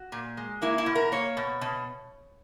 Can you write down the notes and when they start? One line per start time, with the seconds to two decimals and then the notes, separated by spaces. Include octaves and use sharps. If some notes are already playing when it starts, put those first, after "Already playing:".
Already playing: F#4
0.12 A#2
0.37 G#3
0.62 A#3 E4
0.78 E4
0.86 B2
0.95 A#4
1.12 A#3 C#5
1.37 B2
1.61 B2